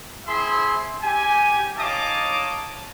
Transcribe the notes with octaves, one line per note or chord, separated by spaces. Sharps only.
C4 E4 G#4 E5 C6
G4 G#5
D#4 C#5 D#5 F5 A5 D6